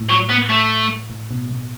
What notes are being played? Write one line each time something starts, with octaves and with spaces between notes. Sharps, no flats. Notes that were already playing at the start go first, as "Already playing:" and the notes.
Already playing: A2
F#3
B3
A3
A2
B2
B2